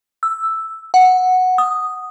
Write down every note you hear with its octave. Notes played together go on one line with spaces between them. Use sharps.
E6
F#5
D#6